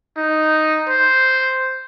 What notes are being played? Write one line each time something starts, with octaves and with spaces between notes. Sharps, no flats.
D#4
C5